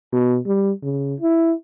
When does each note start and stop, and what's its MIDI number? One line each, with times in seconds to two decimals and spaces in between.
0.12 0.38 47
0.47 0.71 55
0.83 1.14 49
1.20 1.53 64